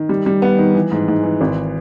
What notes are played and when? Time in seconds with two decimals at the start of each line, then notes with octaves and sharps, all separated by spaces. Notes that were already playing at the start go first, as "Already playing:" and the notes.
Already playing: D#3
0.09 G3
0.26 G3
0.42 B3
0.58 D#3
0.74 E3
0.91 G#2
1.08 G#2
1.23 E3
1.41 G#1